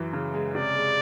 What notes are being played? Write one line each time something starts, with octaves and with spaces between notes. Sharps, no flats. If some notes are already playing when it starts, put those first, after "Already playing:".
Already playing: F#2 E3
C#3
G#3
C3 D5
G#3